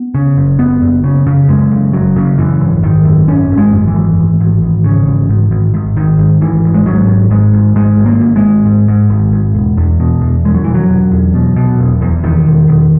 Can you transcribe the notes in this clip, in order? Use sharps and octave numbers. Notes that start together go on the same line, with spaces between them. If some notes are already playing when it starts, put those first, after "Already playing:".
Already playing: B3
C#3
F#1
F#1 B3
F#1
C#3
C#3
F#2 G#3
C#3
F#1 F#3
C#3
F#2 E3
G#1
G#1 D#3
F#2
G#1 C#4
G#1
G#3
F#2
E3
G#1
G#1
G#1
G#1
C#3
G#1
G#1
G#1
G#1
G#1 D#3
G#1
G#1 E3
G#1
G#3
G#2 F#3
G#1
G#2 G#3
G#1
G#2 G#3
G#1
A#3
G#1
G#3
G#1
G#2
G#2
G#1
G#1
E1
E2
B2
E2
E1 G#3
F#3
E1 E3
F#3
E1
E2
B2
B2
E1
E2
E1 D#3
E1
E1